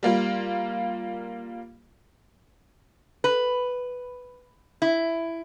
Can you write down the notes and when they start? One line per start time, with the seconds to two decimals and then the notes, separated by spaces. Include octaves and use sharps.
0.03 G3 A#3 F4
3.24 B4
4.82 E4